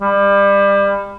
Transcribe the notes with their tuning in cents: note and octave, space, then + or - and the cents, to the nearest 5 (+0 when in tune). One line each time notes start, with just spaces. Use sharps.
G3 +30